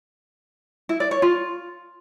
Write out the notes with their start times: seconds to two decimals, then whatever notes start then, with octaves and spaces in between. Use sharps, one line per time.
0.89 E4
1.00 D5
1.11 C#5
1.22 F4